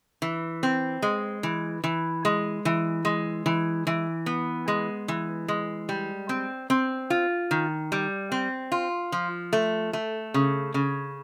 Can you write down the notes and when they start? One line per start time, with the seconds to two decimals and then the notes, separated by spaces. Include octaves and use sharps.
0.22 E3
0.63 C4
1.02 G#3
1.43 E3
1.84 E3
2.25 G#3
2.65 E3
3.05 G#3
3.46 E3
3.87 E3
4.26 B3
4.68 G#3
5.08 E3
5.48 G#3
5.89 G3
6.29 C4
6.70 C4
7.10 F4
7.51 D#3
7.92 G3
8.32 C4
8.72 F4
9.12 F3
9.53 A3
9.93 A3
10.34 C#3
10.74 C#3